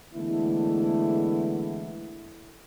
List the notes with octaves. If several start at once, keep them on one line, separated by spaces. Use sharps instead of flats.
D3 E3 G#3 A3 B3 E4